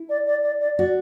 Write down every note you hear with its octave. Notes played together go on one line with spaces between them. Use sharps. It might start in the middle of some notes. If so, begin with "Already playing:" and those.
Already playing: E4
D5
D5
D5
D5
F#4 D5